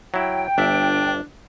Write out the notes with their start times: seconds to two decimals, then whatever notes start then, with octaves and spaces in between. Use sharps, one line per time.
0.14 F#3 E4 G5
0.58 G1 D4 E5